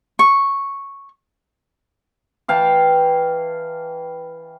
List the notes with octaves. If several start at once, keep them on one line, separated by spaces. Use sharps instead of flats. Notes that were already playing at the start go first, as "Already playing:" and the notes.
C#6
E3 F5 G5 A5